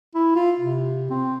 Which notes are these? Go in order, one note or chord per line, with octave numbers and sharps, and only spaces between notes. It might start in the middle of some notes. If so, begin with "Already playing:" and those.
E4
F4
C3
C4